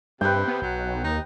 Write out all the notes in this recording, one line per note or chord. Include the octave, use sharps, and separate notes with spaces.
G2 C3 B4 G5
B3
B1 F#3
D#2 D#4